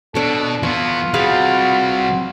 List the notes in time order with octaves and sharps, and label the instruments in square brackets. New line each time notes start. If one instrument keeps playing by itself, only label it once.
[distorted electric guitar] B2 [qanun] D4 C#5 [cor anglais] A4
[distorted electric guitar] E3 B3 [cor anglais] F4 [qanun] C#6
[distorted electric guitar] C3 G3 [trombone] F#4 [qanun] G#4 B4 F5